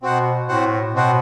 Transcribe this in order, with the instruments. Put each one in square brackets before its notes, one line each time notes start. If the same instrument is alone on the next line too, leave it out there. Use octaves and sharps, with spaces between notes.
[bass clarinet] B2 [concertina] C4 F#4 C5 F#5
[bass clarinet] A2 [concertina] C4 F#4 C5 F#5
[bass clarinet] B2 [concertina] C4 F#4 C5 F#5